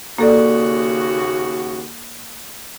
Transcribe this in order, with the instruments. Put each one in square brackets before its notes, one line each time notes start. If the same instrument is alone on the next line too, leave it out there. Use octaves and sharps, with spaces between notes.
[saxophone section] D#2 C#3 F#4 [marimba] A#3 A4 D5